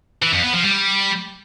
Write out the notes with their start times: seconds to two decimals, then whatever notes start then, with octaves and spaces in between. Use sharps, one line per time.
0.22 E3
0.33 F2
0.43 B3
0.53 F3
0.64 G3